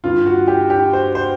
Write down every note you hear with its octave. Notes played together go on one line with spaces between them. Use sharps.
G2 D3 F4
F#4
G4
G4
C5
C5